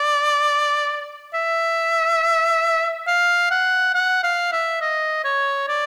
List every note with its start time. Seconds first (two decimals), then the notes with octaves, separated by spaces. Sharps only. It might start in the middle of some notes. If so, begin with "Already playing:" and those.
Already playing: D5
1.34 E5
3.07 F5
3.51 F#5
3.94 F#5
4.23 F5
4.52 E5
4.81 D#5
5.24 C#5
5.68 D5